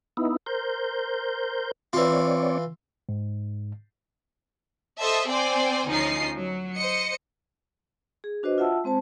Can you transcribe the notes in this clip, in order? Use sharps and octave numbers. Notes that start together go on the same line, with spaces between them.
B3 D#4 E4
A#4 C5 G6
E3 C4 F4 C#5 D5
G#2
A4 C5 D#5 E5 A5
C4 C5 D5 G5 G#5
D2 F3 C#4 D#4 D#5 C7
F#3
C5 D#5 C#7
G#4
D4 F#4 B4 C5 D#5
F4 E5 F#5 A5 E6
G#3 C4 C5 A5